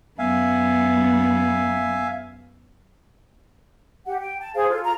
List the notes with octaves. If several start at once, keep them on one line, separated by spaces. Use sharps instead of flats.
F#2 B3 E5 F5 G#5
G4 F#5
G5
A5
G#4 C5 F5
F4 A4
F4 A#5